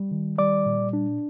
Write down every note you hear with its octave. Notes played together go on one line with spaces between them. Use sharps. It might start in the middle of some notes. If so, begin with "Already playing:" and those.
Already playing: G3
D#3
G3 D5 D6
A#2
D4